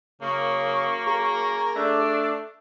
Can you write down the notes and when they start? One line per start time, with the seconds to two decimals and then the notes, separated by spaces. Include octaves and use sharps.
0.22 F#2 C#3 A#3 F5 C#6
1.07 G#4 A#4
1.75 A3 D4